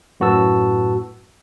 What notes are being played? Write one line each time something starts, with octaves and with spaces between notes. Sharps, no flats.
F#2 A2 F#4 B4 A5 E6